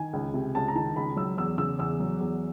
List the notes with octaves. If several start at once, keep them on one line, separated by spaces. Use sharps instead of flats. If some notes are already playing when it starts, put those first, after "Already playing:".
Already playing: D#3 G#5
C#2
C3
C#2 A5
A#5
D#3 A5
C#2 B5
F#3 E6
E2 E6
C#3 E6
E2 E6
F#3
E2